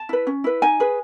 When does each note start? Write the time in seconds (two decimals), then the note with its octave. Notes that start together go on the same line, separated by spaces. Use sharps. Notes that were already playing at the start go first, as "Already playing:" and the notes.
Already playing: A5
0.09 E4 B4
0.27 C#4
0.44 E4 B4
0.62 D#4 G#5
0.80 G#4 B4